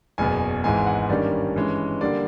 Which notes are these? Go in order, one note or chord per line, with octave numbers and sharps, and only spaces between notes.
F#1 E2 B2 G#5
G#1 G#2 E3 G#3 G#5
F#5
G2 D#3 G3 A#3 C#4 D5
G2 E3 G#3 C#4
D3 G3 A#3 D5